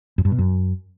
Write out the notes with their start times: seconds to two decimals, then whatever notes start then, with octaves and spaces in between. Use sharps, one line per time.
0.18 F#2
0.25 G2
0.32 B2
0.39 F#2